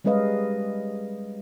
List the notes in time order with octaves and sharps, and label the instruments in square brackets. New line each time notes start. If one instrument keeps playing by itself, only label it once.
[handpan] G3 G#3 C#4 B4 D#5 F5